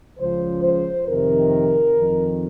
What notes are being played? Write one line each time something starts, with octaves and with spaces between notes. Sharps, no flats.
C#2 C#3 F3 C5
C5
F2 C3 D#3 A#4
F2 D#3